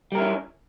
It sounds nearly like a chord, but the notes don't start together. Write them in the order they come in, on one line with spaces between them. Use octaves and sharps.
G3 A#4 E4 C#4